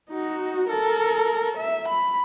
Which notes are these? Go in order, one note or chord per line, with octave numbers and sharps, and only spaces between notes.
D#4 F#4
A4 A#4
E5
B5